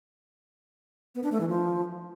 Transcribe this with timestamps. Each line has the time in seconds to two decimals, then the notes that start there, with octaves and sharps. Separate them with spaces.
1.15 B3
1.23 D4
1.32 A3
1.40 E3
1.49 F3